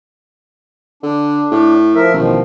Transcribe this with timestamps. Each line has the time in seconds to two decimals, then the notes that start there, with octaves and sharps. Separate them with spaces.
1.03 D3 D4
1.51 A2
1.95 F3 A#4 E5
2.13 A1 B2 D#3 F3